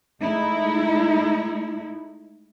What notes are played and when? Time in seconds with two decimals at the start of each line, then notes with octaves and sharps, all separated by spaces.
0.23 G#3 A3 D#4 E4